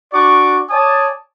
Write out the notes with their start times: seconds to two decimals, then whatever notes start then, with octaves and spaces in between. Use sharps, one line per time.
0.13 D4 F#4 D5 C#6 D6
0.70 C#5 D5 G#5 A5 D#6